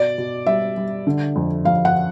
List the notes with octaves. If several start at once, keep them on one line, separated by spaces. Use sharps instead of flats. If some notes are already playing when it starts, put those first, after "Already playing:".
Already playing: B2 D5
B2
G3 E5
G3
D3
F2
F2 F5
F#5